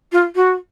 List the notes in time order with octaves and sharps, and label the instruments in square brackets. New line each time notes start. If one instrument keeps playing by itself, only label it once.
[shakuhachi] F4
F#4